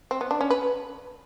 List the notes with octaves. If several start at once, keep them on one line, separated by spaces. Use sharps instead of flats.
C4
B3
D4
C#4
B4